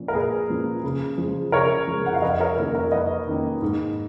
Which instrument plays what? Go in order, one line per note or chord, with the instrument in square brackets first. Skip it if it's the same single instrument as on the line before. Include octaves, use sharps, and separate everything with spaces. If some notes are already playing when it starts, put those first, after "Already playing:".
Already playing: [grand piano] A#2 F3 A#3 C#4
A#4
A#2 G#4 B4
F3 A#3 C#4
C#3
F3 G#3
C#3 A#4 C#5
F3 G#3
F#5
F5
F2 B4 D#5
A#4 C#5
D#3 A#3 C#4 F4 A#4
A#4
F2 B4 D#5
D#3 A#3 C#4 F4
G#2